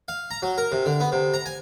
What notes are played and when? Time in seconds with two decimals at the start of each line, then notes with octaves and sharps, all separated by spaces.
0.08 F5
0.31 A#5
0.42 F#3
0.58 A#4
0.72 C3
0.86 D3
1.00 B3
1.12 C3
1.34 A#5
1.46 G#5